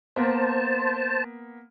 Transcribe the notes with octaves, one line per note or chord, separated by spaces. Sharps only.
A#3 B3 C5 A5